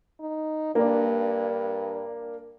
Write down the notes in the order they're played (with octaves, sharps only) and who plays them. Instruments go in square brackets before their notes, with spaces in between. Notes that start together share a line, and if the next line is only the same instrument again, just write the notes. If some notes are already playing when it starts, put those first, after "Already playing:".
[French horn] D#4
[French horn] G2 [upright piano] A#3 D4